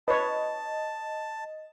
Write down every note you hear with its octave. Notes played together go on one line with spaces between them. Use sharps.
B4 C#5 D#5 A5